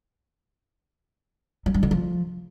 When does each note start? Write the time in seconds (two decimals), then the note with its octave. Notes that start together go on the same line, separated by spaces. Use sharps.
1.66 F#3
1.74 G2
1.83 D3
1.91 F3